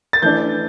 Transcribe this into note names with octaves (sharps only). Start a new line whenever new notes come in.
A6
E3 A3 D4 G6